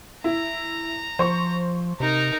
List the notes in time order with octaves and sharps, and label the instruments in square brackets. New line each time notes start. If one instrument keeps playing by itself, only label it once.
[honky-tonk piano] E4 [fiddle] A#5
[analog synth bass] F3 [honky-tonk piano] C5 C#6
[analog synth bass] C3 [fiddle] D#4 A#4